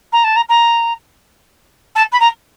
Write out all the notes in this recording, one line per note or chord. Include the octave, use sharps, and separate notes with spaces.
A#5
A5
A#5
A#5
A5
B5
A#5